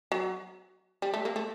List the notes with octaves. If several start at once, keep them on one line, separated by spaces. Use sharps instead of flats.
F#3
G3
A3
A#3
A3